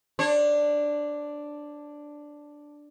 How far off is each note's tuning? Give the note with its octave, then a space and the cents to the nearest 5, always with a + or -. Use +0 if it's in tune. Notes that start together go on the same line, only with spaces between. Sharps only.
D4 +0 C#5 -40